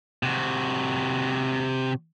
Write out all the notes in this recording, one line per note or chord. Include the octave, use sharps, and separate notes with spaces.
C3 F#4